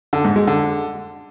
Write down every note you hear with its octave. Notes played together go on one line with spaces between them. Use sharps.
D3
G#2
G#3
D3